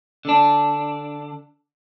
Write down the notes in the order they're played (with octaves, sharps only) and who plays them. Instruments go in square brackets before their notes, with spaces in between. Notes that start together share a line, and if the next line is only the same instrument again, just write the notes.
[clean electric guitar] D3 D4